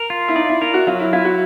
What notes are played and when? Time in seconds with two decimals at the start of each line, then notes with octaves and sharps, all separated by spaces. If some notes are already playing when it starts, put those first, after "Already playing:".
Already playing: A#4
0.10 F4
0.28 E4
0.35 D#4 D5
0.49 E4
0.61 E4 A#4
0.74 F#4
0.87 F#3 F4
0.99 E4
1.13 E4 F4
1.25 F#4